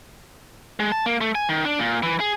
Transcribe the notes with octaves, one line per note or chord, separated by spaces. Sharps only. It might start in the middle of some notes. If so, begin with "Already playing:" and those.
G#3
A5
A#3
A3
G#5
D#3
D4
A#2
E3
G#4